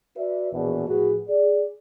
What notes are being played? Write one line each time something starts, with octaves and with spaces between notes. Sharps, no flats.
F#4 B4 D5 E5
A#1 E2 B2
A2 F3 F#4 G#4 B4
G#4 D5